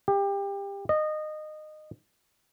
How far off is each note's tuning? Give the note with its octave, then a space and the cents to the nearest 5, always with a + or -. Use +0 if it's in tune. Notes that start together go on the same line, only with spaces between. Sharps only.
G4 +25
D#5 -20